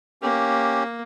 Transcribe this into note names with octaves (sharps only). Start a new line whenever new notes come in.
A#3 C#4 G4